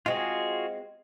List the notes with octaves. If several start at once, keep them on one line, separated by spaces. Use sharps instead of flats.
G#3 C4 F4 F#4 G#4